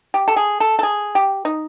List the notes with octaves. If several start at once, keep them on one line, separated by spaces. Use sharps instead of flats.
G4
A4
G#4
A4
A4
G#4
G4
D#4